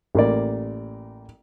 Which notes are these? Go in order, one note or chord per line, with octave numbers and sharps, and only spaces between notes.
A1 A#3 D5